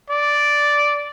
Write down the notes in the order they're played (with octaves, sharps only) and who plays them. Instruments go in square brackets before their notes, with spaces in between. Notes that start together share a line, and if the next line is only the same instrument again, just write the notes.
[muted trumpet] D5